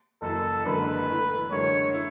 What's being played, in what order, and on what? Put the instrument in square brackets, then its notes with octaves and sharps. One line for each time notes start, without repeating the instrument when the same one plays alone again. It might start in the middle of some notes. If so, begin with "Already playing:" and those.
[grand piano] F#1 F#2 E3 [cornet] A4
[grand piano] F#1 F#2 D3 G#3 D4 [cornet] B4
[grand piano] A2 E3 A3
[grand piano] F#2 D3 G#3 [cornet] C#5
[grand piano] E4